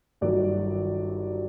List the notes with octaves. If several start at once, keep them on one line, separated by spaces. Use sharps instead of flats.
G1 G2 D#3 F#3 D5